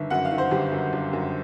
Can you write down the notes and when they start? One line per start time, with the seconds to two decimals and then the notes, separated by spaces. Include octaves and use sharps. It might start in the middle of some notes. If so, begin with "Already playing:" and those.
Already playing: G1 D#3 E5
0.10 F#2 F#5
0.25 F5
0.31 D#3
0.38 C5
0.51 G1 G4
0.72 F#2
0.93 G1
1.13 F#2